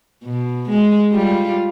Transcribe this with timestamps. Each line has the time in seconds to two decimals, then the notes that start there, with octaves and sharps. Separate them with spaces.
0.24 B2
0.69 G#3
1.12 G3 F4